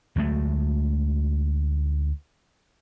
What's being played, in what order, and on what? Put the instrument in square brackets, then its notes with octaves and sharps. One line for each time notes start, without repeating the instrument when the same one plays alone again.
[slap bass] D2 F#3 G#3 A3